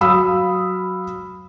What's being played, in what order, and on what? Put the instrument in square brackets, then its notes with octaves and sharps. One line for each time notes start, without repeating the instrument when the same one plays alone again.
[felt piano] F#3 F5 B5 D#6 E6